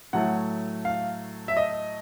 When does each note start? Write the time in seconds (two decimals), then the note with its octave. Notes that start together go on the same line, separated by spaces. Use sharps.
0.13 A2 F#3 A3 F#5
0.85 F5
1.48 E5
1.57 D#5